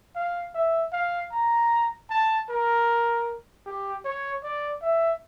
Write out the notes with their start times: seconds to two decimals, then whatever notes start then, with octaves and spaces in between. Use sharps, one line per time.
0.15 F5
0.54 E5
0.93 F5
1.32 A#5
2.10 A5
2.49 A#4
3.66 G4
4.05 C#5
4.43 D5
4.82 E5